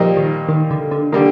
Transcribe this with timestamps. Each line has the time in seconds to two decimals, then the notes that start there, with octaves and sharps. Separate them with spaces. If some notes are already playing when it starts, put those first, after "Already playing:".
Already playing: A#2 F3 G3 A#3 D#4
0.17 D#3
0.49 D#3
0.71 D3
0.91 D3
1.12 D3 D#3 G3 A#3